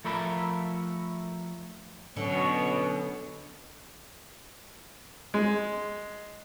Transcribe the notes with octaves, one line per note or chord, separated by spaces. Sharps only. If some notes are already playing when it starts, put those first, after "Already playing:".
F3 A3 A#4 E5 A5 B5
B2 D3 F#3 B3 C#4 C#5
G#3